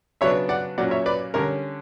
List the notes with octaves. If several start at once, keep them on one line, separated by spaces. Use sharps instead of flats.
C#3 F#3 B3 D4 C#5 E5
D5 F#5
A#2 F#3 A#3 C#4 D5 F#5
C#5 E5
B4 D5
D3 G3 C#4 A#4 C#5